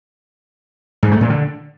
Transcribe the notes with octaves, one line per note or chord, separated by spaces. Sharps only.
G#2
A3
A#2
D3